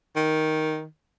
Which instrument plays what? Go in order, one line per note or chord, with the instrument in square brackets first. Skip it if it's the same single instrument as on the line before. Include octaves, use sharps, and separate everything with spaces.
[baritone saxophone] D#3